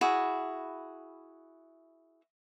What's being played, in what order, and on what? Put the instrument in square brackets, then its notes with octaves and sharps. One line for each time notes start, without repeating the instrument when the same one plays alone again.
[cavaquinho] E4 F#4 G#4